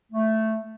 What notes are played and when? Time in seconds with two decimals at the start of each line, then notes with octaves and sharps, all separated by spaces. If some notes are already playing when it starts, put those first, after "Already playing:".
0.12 A3